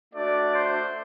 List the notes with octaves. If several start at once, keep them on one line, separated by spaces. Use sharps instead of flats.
A3 D4 F#4 D5
C5